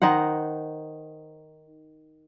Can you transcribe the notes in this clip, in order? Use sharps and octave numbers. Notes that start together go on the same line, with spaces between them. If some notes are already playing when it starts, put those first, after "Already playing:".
D#3 D#4 C5 F#5